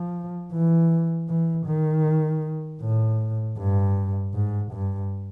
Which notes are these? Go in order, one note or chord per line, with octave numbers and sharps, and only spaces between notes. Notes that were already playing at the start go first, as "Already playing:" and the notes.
Already playing: F3
E3
E3
D#3
A2
G2
G#2
G2